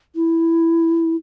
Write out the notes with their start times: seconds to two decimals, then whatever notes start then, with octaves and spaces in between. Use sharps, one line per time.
0.16 E4